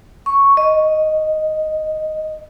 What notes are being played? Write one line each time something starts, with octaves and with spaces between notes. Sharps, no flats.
C#6
D#5